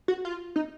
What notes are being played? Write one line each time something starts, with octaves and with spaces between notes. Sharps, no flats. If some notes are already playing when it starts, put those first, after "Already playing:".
F#4
F4
D#4